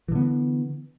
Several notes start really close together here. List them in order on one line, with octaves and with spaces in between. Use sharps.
E3 D3 B3